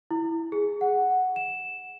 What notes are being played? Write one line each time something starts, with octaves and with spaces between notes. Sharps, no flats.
E4
G#4
F#5
E7